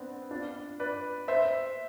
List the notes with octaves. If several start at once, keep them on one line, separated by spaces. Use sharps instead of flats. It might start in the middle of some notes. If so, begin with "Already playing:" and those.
Already playing: B3 C4 D4
D4 F4
B4 D5
C5 E5